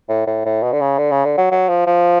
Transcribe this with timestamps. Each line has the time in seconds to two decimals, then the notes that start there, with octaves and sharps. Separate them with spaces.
0.09 A2
0.27 A2
0.45 A2
0.63 B2
0.72 D3
0.81 C#3
0.98 D3
1.11 C#3
1.25 D3
1.38 F#3
1.51 F#3
1.69 F3
1.87 F3